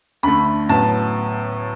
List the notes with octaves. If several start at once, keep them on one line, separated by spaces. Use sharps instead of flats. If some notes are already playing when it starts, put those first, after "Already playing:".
D2 D3 A3 B5
A2 F#3 B3 A5